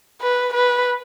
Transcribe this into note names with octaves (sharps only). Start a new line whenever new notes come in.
B4
B4